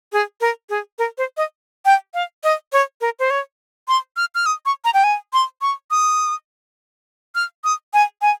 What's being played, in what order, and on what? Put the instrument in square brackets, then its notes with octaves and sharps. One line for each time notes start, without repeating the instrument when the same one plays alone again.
[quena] G#4
A#4
G#4
A#4
C5
D#5
G5
F5
D#5
C#5
A#4
C5
C#5
C6
F6
F6
D#6
C#6
A#5
G5
G#5
C6
C#6
D#6
F6
D#6
G#5
G#5